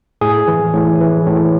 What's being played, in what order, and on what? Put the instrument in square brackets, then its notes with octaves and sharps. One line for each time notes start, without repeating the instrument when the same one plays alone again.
[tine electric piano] A2 G#4
E3
A2
E3
A2